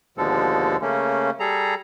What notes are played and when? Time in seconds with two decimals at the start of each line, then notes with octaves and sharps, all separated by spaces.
0.17 D#2 B2 D3 F3 G#3 A4
0.82 C#3 A3 A#3 C#4
1.40 G3 G#4 A4 A#5